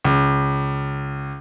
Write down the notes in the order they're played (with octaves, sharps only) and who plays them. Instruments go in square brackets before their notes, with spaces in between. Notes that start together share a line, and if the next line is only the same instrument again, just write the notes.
[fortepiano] C#2